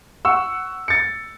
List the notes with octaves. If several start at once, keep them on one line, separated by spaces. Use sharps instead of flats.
F#5 C#6 E6
A6 C#7